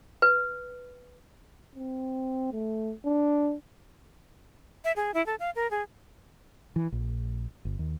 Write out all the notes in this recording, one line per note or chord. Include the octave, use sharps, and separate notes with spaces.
B4
C4
A3
D4
E5
G#4
E4
A4
F5
A#4
G#4
E3
A#1
G1
D#2